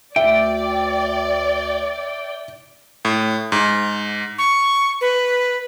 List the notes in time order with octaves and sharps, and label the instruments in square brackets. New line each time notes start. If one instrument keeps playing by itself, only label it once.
[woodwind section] D2 [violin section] D5 [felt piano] E5 [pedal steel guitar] G5
[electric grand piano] A2
G#2
[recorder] C#6
B4